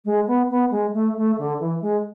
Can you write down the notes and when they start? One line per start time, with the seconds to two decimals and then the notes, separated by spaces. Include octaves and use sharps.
0.05 G#3
0.27 B3
0.49 B3
0.71 G#3
0.93 A3
1.16 A3
1.38 D3
1.59 E3
1.81 G#3